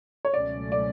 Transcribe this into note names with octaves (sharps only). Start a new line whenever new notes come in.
C#5
C#2 B2 F#3 A3 C#4 D5
D5